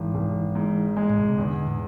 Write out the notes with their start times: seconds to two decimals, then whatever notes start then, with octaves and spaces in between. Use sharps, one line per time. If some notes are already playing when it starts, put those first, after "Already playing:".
Already playing: G#1 E3
0.15 G#1
0.55 G#2
0.97 G#3
1.10 A2
1.20 B2
1.28 C3
1.38 E2 D3
1.67 A2